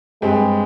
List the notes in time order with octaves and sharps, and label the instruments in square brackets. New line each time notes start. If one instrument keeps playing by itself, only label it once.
[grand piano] G2 G3 C4 G4 [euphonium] G#3